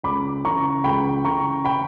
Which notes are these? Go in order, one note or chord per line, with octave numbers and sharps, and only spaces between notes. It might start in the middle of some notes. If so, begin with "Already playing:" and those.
C#2 B5 D6
C#3 E3 A#5 C#6
C#2 G5 B5
C#3 E3 A#5 C#6
G5 B5